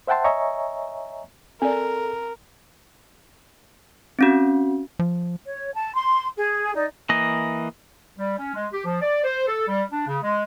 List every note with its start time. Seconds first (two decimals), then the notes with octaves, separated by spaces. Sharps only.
0.07 C5 E5 F#5 G5 A5 C6
0.25 C#5 D#5 E5 G#5 A#5 C#6
1.62 C4 A4 A#4 D5
4.19 C4 C#4 F#4
4.99 F3
5.46 C#5
5.75 A5
5.94 C6
6.37 G#4
6.76 D#4 D5
7.09 E3 A#3 D#5
8.18 G3
8.38 C#4
8.54 G#3
8.73 G4
8.85 F3
9.01 D5
9.24 C5
9.47 A4
9.68 G3
9.90 D4
10.07 C#3
10.23 G#3